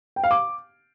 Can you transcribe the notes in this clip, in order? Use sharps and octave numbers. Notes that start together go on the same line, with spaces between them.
G5
F5
D6